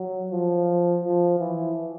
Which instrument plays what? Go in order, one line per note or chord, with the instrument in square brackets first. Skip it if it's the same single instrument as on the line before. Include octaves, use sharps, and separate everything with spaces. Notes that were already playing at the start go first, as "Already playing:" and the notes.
Already playing: [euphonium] F#3
F3
F3
E3